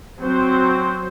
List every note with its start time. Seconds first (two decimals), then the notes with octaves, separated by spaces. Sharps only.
0.19 F#3 C4 C5